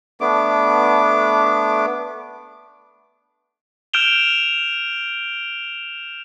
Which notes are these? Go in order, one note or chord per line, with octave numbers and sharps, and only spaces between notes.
A3 B3 D4 D6
F6 G6 D7 E7 F7 G7